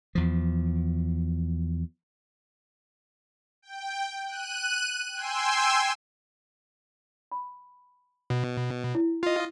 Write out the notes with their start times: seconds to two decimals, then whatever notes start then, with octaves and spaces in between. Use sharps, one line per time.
0.15 E2 F3
3.62 G5
4.27 F#6 D#7
5.14 G5 G#5 C6 E6
7.32 B5
8.30 B2
8.95 E4
9.23 F4 D#5